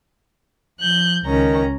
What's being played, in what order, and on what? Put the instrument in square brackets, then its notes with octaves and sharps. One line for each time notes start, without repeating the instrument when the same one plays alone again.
[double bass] F3 [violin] F#6 G6
[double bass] C#2 [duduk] D#3 [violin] C#4 A#5